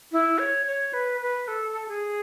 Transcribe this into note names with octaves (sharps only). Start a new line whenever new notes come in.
E4
C#5
C#5
B4
B4
A4
G#4